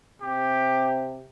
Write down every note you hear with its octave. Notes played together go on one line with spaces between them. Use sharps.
C3 G4